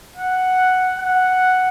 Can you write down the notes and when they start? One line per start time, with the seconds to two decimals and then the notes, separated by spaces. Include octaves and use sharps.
0.16 F#5
0.99 F#5